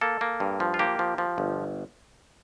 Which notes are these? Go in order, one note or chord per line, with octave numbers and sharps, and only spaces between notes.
A#3 A4
A#3
G2
F3
F4
A#3 G4
F3
F3
G1